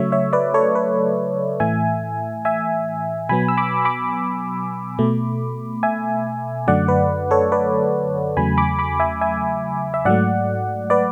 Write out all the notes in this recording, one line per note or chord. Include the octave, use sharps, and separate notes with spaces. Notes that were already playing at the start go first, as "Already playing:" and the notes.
Already playing: C#3 F#3 A3 C#5 E5
C#5 E5
B4 D5
A4 C#5
B4
A2 E3 A3 E5 G#5
E5 G#5
B2 F#3 B3 G#5 B5
E6
B5 D6
B5 D6
B2 A3
E5 G#5
F#2 D3 F#3 A3 D5 F#5
B4
A4 C#5
B4 D5
E2 C#3 F#3 A3 G#5 B5
B5 D6
B5 D6
E5 G#5
E5 G#5
E5
G#2 F#3 A3 D5 F#5
B4 D5